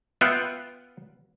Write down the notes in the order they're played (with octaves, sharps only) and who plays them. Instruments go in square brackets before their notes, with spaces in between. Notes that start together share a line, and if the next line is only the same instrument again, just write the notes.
[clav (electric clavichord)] B3 F4 E5 F#5 G5